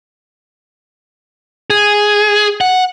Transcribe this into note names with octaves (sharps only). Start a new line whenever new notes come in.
G#4
F#5